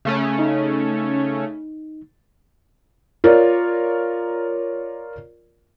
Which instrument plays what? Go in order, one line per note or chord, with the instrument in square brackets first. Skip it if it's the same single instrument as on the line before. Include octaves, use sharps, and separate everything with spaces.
[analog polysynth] C#3 A3 C#4
[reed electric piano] D#4
[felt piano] F4 A#4 C#5 D5